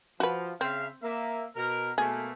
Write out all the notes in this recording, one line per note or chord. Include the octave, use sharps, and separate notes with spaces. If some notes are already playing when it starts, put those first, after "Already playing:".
F3 F#4 B4
C#3 C4 E5 F5
A#3 E5
B2 A#4
B2 A3 A#3 G#4